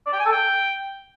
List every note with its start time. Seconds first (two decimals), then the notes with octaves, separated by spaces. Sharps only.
0.07 D5
0.13 G5
0.19 G#5
0.26 A4
0.32 G5